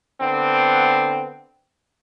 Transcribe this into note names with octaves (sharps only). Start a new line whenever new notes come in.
D3 B3 C4